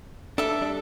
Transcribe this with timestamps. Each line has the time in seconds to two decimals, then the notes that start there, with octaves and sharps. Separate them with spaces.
0.38 D4 A4 E5
0.61 G3 D4